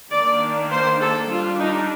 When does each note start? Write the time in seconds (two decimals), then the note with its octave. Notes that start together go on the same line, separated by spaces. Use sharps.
0.11 D#3 A#3 D4 D5
0.71 C5
1.00 A4
1.30 G3 D4 F4
1.60 D#4